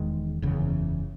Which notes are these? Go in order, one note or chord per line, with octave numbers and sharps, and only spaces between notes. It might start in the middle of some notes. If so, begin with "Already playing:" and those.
Already playing: E1 E2 D#3 G#3
F#1 E2 C#3